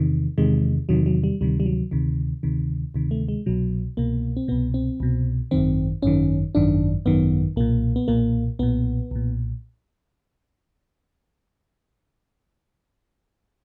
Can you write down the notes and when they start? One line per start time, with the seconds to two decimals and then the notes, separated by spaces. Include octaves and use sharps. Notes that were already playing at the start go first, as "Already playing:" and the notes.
Already playing: E2 C3 D#3
0.38 E2 C3 D#3 G#3
0.89 E2 C3 D#3 F#3
1.06 F#3
1.24 G3
1.41 D2 C3 D#3 G3
1.60 G3
1.66 F#3
1.91 D2 C3 D#3
2.43 D2 C3 D#3
2.94 D2 C3 D#3
3.11 A3
3.28 G#3
3.46 C2 B2 F#3
3.97 C2 B2 A#3
4.37 C4
4.48 C2 B2 B3
4.74 C4
5.00 C2 B2
5.51 G#1 F#2 D#3 C4
6.02 G#1 F#2 D#3 C#4
6.55 G#1 F#2 D#3 D4
7.06 G#1 F#2 D#3 B3
7.56 B1 A#2 A#3
7.96 B3
8.08 B1 A#2 A#3
8.59 B1 A#2 B3
9.11 B1 A#2